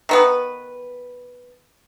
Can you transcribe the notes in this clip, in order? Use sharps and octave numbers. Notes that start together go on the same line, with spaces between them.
D#3 B3 B4